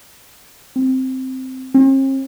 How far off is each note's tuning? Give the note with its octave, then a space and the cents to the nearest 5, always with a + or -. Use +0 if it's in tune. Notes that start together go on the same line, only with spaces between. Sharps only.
C4 -5
C4 +45